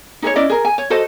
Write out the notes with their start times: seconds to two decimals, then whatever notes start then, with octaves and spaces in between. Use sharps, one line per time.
0.22 D#4 G#4 B4 C#5
0.36 C#4 E4 D5 D#5
0.50 G#4 A#4
0.65 G#5
0.78 C#5
0.90 F#4 A4 C5 D#5